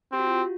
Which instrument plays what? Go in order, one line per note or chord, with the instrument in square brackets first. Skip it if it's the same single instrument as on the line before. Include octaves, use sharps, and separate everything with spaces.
[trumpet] C4 [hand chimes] G4
[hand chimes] F#4
F4
F#4